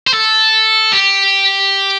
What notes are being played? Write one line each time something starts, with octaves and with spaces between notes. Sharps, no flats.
C5
A4
G4